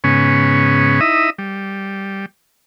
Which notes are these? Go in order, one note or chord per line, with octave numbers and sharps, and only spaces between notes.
G#2 C#3 B3 C#4
D#4 E4 D#5 E5
G3